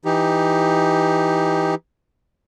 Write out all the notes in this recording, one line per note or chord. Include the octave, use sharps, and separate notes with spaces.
E3 D#4 G4